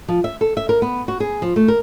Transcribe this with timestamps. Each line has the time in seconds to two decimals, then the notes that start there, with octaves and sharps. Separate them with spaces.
0.08 F3
0.24 E5
0.41 A4
0.57 E5
0.69 A#4
0.82 B3
1.08 F#4
1.20 G#4
1.42 F3
1.56 A3
1.68 A#4